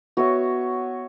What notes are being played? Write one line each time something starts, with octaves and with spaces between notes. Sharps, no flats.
B3 F#4 C#5 E5